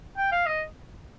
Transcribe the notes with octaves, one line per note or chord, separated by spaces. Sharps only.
G5
F5
D#5